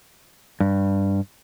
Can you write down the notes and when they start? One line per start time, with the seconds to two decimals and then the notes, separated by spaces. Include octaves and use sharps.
0.60 G2